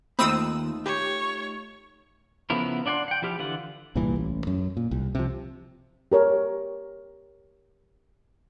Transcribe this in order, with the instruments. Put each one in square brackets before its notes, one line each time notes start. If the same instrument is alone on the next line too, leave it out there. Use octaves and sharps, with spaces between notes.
[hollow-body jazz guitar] D#2 B5 [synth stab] A3 D#4 F4 [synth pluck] C4 D#6 E6
[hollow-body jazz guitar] G4 [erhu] C#5
[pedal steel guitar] C#3 F3 B3 E4 A#4
D4 D5 F#5 G#5 C6
F#5 G5
F3 E4 G4 F6
D3 E3 F4 F#5
[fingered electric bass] C2 G2 A#2 E3
A1
F#2
A#2
C2
C3 F3
[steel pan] G4 A#4 C#5